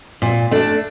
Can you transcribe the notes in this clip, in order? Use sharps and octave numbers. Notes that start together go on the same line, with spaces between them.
A#2
A3 D4